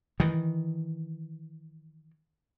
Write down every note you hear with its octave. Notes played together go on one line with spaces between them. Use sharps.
D#3 E3